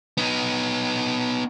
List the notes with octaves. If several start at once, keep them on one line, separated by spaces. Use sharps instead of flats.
B3 D#4